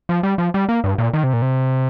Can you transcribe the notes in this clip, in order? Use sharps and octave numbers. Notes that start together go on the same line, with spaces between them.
F3
G3
F3
G3
A#3
G2
A#2
D#3
C3
A#2
C3